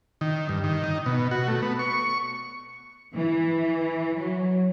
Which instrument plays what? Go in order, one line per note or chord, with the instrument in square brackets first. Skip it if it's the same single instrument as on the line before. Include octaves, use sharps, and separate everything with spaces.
[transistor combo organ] D#3
G2
D#3
D#4
B2
F#4
A3
B3
C#6
[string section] E3
F#3